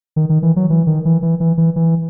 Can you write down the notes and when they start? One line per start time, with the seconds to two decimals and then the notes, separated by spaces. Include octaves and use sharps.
0.16 D#3
0.29 D#3
0.42 E3
0.56 F#3
0.70 E3
0.87 D#3
1.05 E3
1.22 E3
1.40 E3
1.58 E3
1.76 E3